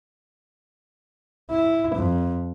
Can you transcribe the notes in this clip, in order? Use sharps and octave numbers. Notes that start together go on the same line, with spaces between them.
E4
F2